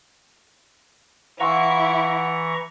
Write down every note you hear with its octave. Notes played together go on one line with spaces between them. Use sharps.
E3 E4 F5 F#5 A#5 C6 C#6